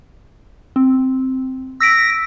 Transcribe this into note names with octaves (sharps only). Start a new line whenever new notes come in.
C4
E6 A#6 B6 D7